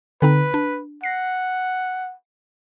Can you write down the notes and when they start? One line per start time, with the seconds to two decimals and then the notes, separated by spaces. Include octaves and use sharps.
0.22 D3 C4 D#4 B4
0.54 D4
1.04 F#5 A#6 C7